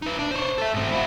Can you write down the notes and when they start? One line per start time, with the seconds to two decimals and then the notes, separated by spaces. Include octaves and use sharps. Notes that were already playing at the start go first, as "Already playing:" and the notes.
0.02 D#4 B4
0.19 D4
0.31 C5 C#5
0.58 A4 E5
0.74 G#2 C4
0.91 E4 F#4